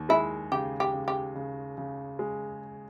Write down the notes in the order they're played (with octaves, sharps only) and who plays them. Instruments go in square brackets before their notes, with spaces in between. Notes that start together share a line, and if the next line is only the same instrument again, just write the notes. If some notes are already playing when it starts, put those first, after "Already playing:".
Already playing: [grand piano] D#2
[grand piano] G#3 [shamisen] E4
[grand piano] C#3 [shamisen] G4
[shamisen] G4
[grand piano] C#3
[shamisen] G4
[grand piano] C#3
C#3
G#3